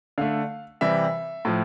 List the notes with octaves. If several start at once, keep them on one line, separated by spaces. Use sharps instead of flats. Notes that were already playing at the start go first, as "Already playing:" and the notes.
D3 A3 F5
C3 E3 G3 E5
A2 F3